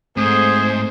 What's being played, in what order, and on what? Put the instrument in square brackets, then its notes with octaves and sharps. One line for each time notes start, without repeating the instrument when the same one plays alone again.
[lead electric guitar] G#2 [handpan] A3 C4 [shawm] G#4 [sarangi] C5